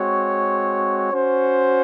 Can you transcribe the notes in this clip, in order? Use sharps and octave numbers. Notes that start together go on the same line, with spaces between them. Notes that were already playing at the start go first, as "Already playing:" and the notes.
Already playing: G#3 C4 F#4 C#5
C#4 F#4 C5